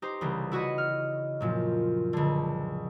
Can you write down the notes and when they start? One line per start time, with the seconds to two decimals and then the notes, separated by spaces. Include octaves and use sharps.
0.02 D#4 G4 C5
0.21 C2 C#3 E3
0.52 E4 F#4 C#5 D#5
0.78 F6
1.40 F#2 A#2 F3
2.13 C#2 D3